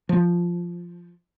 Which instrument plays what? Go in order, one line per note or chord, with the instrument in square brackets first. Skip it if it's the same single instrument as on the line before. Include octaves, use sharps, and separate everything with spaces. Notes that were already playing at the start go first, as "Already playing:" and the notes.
[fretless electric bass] F3